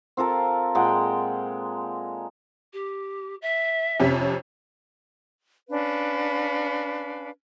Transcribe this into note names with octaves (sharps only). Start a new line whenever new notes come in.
C4 F4 A4 A#4
A#2 G#3 F#5 G5
G4
E5
F2 C3 C#4
C#4 D4 B4 F5